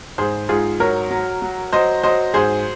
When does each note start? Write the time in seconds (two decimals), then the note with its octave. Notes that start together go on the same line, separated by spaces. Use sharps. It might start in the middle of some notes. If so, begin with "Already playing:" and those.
0.18 G#2 G#4 C5
0.49 G#2 F4 G#4
0.80 F#3 A#4 C#5
1.11 F#3
1.42 F#3
1.73 F#3 C5 D#5
2.03 F#3 C5 D#5
2.34 G#2 G#4 C5